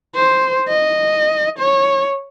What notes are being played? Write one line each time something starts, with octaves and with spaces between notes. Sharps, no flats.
C5
D#5
C#5